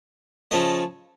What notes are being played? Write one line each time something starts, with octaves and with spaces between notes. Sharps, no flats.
C#3 F3 A3 D#5